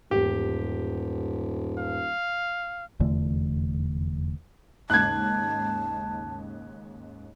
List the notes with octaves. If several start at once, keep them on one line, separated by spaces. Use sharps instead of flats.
D#1 E2 G#2 G4
F5
F1 E2 D3 A3
D#2 G#2 C#3 A5 F#6 G#6